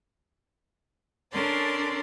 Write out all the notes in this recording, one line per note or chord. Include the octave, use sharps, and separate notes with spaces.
C#4 D4 A4 A#4 D5 C6